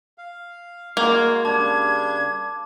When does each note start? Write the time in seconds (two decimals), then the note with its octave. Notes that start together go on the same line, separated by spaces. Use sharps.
0.18 F5
0.97 G#3 A#3 F#4 F5 G#6
1.45 C#3 G3 D4 A5 D6 G#6